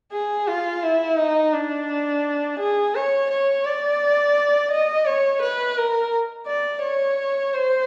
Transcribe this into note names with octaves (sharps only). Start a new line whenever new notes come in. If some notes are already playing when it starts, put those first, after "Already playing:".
G#4
F4
E4
D#4
D4
G#4
C#5
C#5
D5
D#5
C#5
B4
A#4
D5
C#5
C5